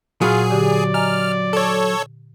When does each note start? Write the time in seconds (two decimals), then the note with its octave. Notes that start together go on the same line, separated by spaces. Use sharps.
0.22 A#2 F#3 F4 G#4 B5 F6
0.51 D3 G4 D5
0.94 D#5 G#5 A#5 F6
1.53 A4 C#5